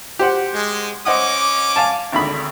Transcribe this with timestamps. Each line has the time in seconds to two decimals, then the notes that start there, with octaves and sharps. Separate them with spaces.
0.19 G4 C5 F#5
0.54 G#3
1.06 C#4 C5 D#5 F#5 D6
1.76 F5 G#5 A5
2.12 G#1 D2 B5